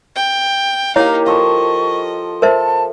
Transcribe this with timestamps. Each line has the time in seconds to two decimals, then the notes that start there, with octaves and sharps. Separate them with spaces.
0.16 G5
0.96 A#3 D#4 E4 G4 C#5 F5 A#5
1.26 F3 A4 D#5 C#6
2.42 A#4 C5 E5 A5